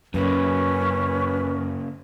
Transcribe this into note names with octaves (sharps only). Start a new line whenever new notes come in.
F#2 C#3 A#3 C#4 B4